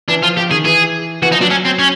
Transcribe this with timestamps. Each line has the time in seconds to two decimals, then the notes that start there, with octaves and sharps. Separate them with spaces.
0.08 E3 D4
0.23 F3 F4
0.37 F3 G4
0.51 D#3 G#4
0.65 E3 G#4
1.22 E3 F#4
1.31 F3 D#4
1.41 F#3 D4
1.50 C#4
1.65 C4
1.79 C#4